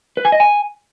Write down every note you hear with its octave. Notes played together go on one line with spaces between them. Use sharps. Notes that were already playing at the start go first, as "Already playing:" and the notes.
B4
G#5
D#5
G#5